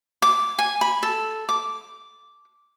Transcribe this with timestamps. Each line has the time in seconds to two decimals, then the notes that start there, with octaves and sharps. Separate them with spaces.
0.22 D6
0.58 G#5
0.81 B5
1.03 A4
1.49 D6